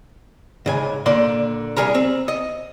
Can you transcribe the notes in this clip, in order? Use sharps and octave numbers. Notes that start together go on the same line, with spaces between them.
G#2 C#3 G#5
A#2 D3 A#3 D5 C6
C2 G3 G#4 A#4 A#5
C4
D#5